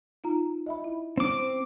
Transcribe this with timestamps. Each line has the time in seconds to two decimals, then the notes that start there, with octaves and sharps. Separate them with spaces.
0.24 D#4 F4 A#5
0.66 D#5 E5 B5
0.84 E4
1.17 C4 D6